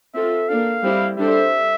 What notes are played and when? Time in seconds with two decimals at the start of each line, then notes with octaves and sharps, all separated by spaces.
0.15 C4 F4 A4 E5
0.48 A#3 D4 A4 F5
0.83 G3 C4 E4 G4
1.18 G3 D4 A4 C5 E5